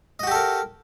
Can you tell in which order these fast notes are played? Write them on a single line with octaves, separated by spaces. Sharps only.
D#5 F#4 G4 A4 A#4